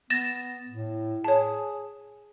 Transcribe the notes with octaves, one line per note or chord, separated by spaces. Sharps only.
B3 A6 A#6 E7
A2
G#4 C#5 A5